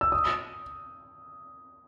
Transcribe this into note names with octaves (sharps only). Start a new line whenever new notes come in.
E6
D#6